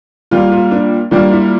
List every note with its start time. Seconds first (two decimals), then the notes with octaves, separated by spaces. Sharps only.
0.31 A#2 G3 A#3 F4
0.52 F4
0.71 D4
1.11 A#2 G3 A#3 D4
1.32 E4